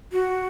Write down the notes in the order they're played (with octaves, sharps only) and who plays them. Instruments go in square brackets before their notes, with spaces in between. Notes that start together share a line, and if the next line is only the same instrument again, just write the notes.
[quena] F#4